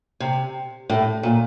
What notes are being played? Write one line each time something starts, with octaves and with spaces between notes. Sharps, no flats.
C3
A2
A#2